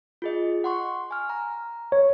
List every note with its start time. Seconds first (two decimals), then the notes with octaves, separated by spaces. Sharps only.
0.22 F4 G#4 D#5
0.64 F#5 C6 C#6
1.11 G#5 F6
1.29 A#5
1.92 C#5